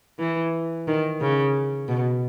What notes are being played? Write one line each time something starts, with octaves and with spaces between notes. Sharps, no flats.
E3
D#3
C#3
B2